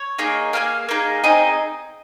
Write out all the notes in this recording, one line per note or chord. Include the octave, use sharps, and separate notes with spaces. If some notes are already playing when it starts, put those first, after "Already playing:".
Already playing: C#5
A#3 D#4 G#4
A#3 D#4 G#4 F5
A#3 D#4 G#4
C4 D#4 G#4 D#5